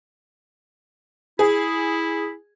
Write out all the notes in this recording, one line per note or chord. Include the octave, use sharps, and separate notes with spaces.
E4 G#4